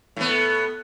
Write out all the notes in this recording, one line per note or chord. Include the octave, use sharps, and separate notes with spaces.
A2 B3